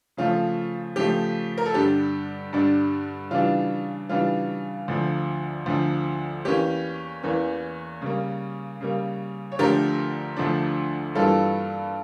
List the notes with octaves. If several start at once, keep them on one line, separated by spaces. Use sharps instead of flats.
C#3 F3 A3 F4
C#3 F3 A3 G4
A#4
A4
G2 D3 G3 D4 G4
G2 D3 G3 D4
C#3 E3 G3 D4 F4
C#3 E3 G3 D4 F4
D2 D3 F3
D2 D3 F3
E2 E3 A#3 C#4 G4
E2 E3 A#3 C#4
C#3 G3 A#3
C#3 G3 A#3
C#5
D2 D3 F3 A3 D4 G4 A#4
D2 D3 F3 A3 D4
G2 E3 G3 A#3 F4 A4